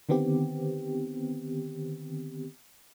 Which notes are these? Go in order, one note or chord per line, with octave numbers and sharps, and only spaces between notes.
D3 D#3 B3 C4 G4